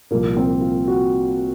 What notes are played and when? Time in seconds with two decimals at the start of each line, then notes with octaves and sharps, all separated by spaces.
0.11 C2 A#2 F3 A#3
0.37 C4
0.61 F4
0.87 F#4